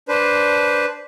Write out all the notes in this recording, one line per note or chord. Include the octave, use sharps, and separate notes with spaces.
D4 B4 C5